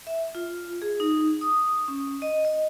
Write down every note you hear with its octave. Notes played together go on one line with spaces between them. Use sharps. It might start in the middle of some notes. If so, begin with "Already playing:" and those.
E5
F4
G#4
D#4
D#6
C#4
D#5
D#5